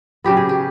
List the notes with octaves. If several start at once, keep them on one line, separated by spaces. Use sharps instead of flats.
C#3 F#3 B3 G4
G#4
G4